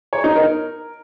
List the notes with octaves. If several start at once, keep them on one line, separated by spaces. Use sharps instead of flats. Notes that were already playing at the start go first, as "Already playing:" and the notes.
C#5
D#4
A#4